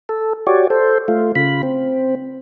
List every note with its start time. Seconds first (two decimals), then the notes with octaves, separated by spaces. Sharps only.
0.09 A4
0.47 F#4 G4 C#5 D5
0.70 A4 C5
1.08 A3 F4
1.35 C#3 F4 B5
1.63 C4